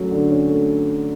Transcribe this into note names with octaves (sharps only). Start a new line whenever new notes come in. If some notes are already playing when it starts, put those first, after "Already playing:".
Already playing: F#3 A3 C#4
D3
C#4
A3